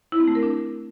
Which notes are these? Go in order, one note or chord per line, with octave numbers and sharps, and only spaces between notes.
E4
C4
A3
A#4
D4